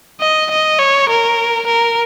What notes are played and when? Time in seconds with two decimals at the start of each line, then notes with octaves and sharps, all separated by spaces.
0.21 D#5
0.51 D#5
0.79 C#5
1.09 A#4
1.67 A#4